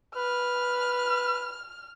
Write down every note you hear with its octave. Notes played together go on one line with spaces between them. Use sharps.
B4 F6